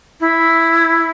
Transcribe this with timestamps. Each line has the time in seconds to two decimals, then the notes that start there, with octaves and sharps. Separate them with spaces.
0.20 E4